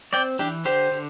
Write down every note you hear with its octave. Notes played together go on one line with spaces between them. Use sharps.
C4 D5 G5
E3 D4 G4
D3 G4 C5
D3